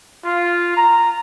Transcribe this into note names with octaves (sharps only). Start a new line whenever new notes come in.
F4
A#5